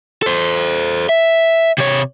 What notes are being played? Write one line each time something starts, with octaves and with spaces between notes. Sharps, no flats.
A4 C5
E5
C3 C#5